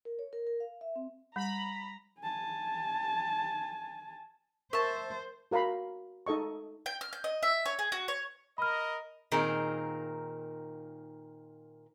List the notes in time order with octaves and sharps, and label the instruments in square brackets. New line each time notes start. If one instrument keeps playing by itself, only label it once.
[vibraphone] A#4
C#5
A#4
A#4
F5
E5
C4
[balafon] G3 [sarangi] A#5 [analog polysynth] B5
[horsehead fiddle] G#5 A5
[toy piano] A#4 [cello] C5 [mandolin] E5 A5 [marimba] C#6
[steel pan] F#4 A#4 F5 A#5 B5
D#4 A4 D#5 C#6
[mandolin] G5
F6
G6
D#5
E5
C#5
G#4
F#4
C#5
[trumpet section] A#4 D#5 [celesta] B5 F6
[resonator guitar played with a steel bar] A#2 D#3 C4 D#4 G#4 A#4